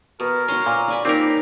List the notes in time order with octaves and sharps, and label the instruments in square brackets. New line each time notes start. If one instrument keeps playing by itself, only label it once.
[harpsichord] B2 [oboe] A#4
[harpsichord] C#4 [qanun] F#4 C6
[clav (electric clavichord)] A#2
[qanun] D5 G#5 B5
[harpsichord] A#2 [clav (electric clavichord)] C4 A#4 [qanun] D#4 C#5 [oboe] G4